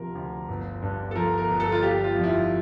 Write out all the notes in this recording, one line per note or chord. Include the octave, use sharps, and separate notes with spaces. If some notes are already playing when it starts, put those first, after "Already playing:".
Already playing: D2 C3 F3 A#4
D2
G1
G2
A4
F3 A#4
A#4
G1
A4
F4
G3 G4
F4
F2
E4
F4